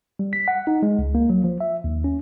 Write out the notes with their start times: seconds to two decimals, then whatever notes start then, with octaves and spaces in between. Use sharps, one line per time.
0.19 G3
0.33 B6
0.48 F#5
0.67 D#4
0.83 G#3
0.99 C#2
1.15 A#3
1.30 F#3
1.44 F3
1.60 E5
1.84 D#2
2.04 C#4